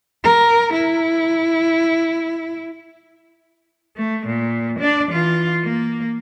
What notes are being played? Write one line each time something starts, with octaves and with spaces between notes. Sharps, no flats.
A#4
E4
A3
A#2
D4 D5
E3 F4
A#3